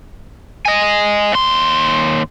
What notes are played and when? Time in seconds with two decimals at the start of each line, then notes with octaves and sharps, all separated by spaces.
0.65 D#5 G#5
1.32 D#2 C6